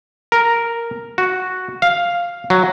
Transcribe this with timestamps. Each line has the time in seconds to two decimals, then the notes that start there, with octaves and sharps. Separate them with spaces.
0.32 A#4
1.18 F#4
1.82 F5
2.50 F#3